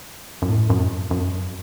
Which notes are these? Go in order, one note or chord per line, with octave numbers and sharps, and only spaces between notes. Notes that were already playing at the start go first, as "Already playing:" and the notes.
F#2
A2
F#2
F#2